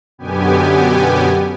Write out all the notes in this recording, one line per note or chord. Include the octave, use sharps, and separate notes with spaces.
F#2 B2 D3 B3 G4 G#5